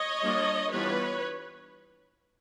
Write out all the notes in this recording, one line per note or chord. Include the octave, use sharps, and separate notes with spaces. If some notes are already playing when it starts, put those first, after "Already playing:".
Already playing: C#5 D#5
G3 A#3 D4 F4
E3 G3 B3 D4 F4 B4 C#5